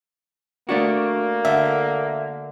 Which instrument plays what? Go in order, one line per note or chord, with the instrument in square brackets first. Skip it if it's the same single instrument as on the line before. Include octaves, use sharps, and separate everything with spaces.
[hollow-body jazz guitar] A3 D4 F#4 [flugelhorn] A#3
[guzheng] D3 [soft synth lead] E5